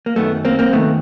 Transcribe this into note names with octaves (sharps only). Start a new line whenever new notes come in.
A#3
F#2 D#3 A3 B3
A#3 C4
A#3 C4
F#2 D#3 A3 B3